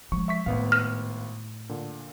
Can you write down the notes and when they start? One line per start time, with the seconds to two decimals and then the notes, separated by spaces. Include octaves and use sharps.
0.12 F3 G#3 C#6
0.28 E5 C#6 B6
0.46 G#1 A2 B3 F5
0.72 F6
1.69 A#2 D3